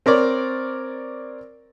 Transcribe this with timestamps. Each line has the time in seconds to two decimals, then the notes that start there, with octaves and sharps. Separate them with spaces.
0.06 C4 A#4 C#5 D5